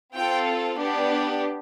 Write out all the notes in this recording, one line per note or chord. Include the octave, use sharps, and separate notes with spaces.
C4 F4 A4 G5
B3 D4 G4